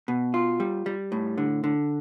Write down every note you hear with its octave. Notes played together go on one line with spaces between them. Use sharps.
B2
F4
G3
G3
A2
D3
D3